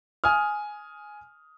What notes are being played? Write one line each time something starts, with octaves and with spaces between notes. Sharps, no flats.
G#5 D#6 F6